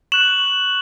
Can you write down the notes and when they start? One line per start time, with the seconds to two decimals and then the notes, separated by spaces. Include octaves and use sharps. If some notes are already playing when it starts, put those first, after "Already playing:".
0.12 C#6 F#6 E7 F#7